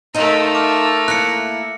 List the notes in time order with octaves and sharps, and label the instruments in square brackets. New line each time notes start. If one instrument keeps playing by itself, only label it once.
[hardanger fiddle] A3 A#4 [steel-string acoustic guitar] D#4 F4
[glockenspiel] D6 F6
[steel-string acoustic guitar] A#3 E4 [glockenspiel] F#6 A#6 C#7